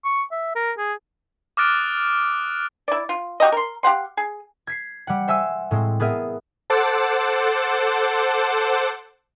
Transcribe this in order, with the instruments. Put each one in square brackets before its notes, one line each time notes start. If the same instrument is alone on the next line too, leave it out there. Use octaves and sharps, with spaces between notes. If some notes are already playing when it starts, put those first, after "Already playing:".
[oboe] C#6
E5
A#4
G#4
[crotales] D6 D#6 F6 F#6 A6 D7
[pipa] E4 D5
F4
F#4 G4 A#4 D#5
A#4 C6
G4 F5 F#5 C6
G#4
[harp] G#6 B6 C7
G3 F#5
C5 E5 G#5 E6
A2 G#3 C4
B3 G#4 A#4 E5
[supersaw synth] A4 C5 F#5 A5 D6